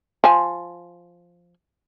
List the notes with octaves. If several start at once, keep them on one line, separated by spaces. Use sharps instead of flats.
F3 G#5